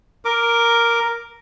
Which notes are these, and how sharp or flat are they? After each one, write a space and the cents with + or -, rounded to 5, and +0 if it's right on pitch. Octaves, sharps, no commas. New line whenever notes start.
A#4 +0 D6 +0